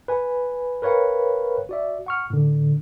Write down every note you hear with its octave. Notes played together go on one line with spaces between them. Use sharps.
B4 G#5
A#4 B4 C#5 F5 G5
F#4 D5 E5
F#5 C#6 F6
A2 D3